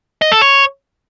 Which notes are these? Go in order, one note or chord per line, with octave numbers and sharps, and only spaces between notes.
D#5
A4
C#5